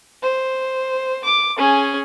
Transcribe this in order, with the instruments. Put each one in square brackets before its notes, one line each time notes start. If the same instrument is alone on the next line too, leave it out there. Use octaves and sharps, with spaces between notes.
[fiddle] C5
D6
C#4 G#4